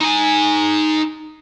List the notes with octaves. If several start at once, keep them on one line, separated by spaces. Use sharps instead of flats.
D#4 G#5